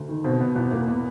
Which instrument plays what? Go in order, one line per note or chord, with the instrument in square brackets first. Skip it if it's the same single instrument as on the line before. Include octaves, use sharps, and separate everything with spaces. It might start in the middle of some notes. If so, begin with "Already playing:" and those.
Already playing: [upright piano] D2
D#3
B2 C4
B2 B3
E2 B3
E2 A#3
B3